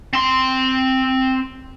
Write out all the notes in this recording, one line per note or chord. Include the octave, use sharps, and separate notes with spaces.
C4 C6